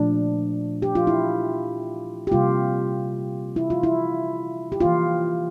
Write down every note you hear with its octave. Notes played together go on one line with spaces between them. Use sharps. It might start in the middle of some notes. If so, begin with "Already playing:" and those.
Already playing: A#2 F3 A3 D4
G4
F4
E4
G4
C3 G3 A#3 F4
E4
F4
E4
G4
E3 A#3 F4